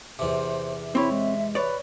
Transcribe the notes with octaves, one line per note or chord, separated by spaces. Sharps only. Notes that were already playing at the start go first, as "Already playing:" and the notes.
E2 C3 C5
C4 E4 C#5 C6
G#3 E5
B4 C#5 D5